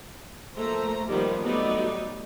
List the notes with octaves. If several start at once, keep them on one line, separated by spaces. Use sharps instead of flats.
F3 A3 A#3 C5 A#5
D#3 F3 G3 A#3 B3 F4
F#3 G3 A3 B3 D#4 D5